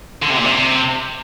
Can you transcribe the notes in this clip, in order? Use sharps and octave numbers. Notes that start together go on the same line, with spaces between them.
D3
C3
A#2
C3